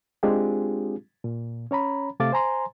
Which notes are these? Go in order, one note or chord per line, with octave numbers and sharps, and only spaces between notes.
G#3 C4 D4 F4 G4 G#4
A#2
C#4 C#5 A#5 B5
C3 A3 F5 D6 A6
C5 G#5 A#5 C6